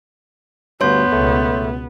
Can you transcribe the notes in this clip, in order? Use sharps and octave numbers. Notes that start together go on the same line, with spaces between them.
D2 G2 B3 C#5 C6 G6
C#2 B2 A3